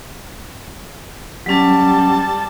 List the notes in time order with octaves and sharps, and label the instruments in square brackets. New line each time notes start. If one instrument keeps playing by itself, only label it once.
[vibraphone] F#3 C#4 [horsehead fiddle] G3 A5